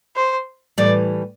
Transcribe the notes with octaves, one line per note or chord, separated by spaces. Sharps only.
C5
A2 E3 G3 D5